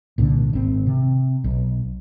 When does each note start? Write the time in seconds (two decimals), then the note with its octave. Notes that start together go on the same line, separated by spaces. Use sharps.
0.18 C2 A#2 D3
0.53 G#1 C4
0.87 C3
1.44 B1